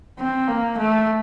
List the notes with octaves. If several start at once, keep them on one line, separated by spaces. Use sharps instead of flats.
C4
A#3
A3